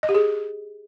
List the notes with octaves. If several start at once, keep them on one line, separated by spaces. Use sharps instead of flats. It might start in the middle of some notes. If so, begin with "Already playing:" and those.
D#5
G4
G#4